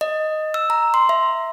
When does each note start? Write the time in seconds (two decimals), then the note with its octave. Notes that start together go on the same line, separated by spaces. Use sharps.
0.01 D#5
0.54 E6
0.70 A#5
0.94 C6
1.09 E5